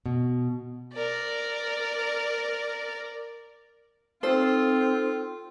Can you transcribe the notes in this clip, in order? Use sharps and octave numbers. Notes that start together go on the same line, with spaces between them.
B2
A#4 D5
C4 D#4 F4 A4 C5 E6